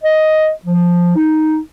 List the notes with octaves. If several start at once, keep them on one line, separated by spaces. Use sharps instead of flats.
D#5
F3
D#4